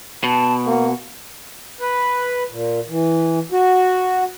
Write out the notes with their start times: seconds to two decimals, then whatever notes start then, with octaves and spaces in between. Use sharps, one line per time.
0.24 B2 A5
0.66 A#3 F#5
1.79 B4
2.50 A#2
2.89 E3
3.52 F#4